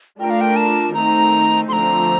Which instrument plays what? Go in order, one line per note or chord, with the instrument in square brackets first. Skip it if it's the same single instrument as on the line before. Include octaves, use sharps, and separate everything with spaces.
[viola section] A3 D4 F4 A#4 [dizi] G5
[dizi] F5
G5
A5
[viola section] D#3 A3 C4 D#4 [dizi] A#5
[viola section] D3 F3 A3 C4 [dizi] A#5 C6